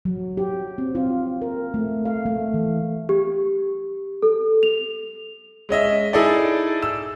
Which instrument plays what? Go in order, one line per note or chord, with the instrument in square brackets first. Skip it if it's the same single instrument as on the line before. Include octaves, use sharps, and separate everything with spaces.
[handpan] F#3
G4
C4
F4
A#4
A3
F5
A3
E3
[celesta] G4
A4
F7
[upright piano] G#3 C#4 D#5 E5
D#4 E4 G#4 A4 D5
E6